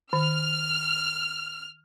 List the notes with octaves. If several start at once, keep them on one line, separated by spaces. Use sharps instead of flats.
D#3 F6